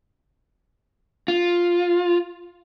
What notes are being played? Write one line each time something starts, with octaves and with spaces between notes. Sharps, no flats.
F4